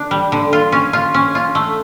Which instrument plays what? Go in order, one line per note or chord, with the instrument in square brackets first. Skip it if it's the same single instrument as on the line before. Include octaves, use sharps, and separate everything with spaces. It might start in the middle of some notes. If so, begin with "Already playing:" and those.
Already playing: [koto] D3 D4
G3
D3
F4
C#4
F4
C#4
F4
A3